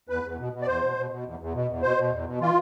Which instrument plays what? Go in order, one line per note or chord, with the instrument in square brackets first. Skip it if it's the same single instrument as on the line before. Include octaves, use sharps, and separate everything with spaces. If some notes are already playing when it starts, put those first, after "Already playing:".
[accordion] E2 B4
E2
B2
B2
D5
E2 C5
B2
B2
B2
E2
E2
B2
E2
B2 C5
B2
E2
B2
E3 F4